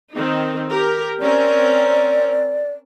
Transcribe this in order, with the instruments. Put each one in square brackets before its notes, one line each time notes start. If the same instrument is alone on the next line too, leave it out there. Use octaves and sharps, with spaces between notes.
[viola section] D#3 C4 D#4
G4 A#4
[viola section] C4 C#4 A#4 [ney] D5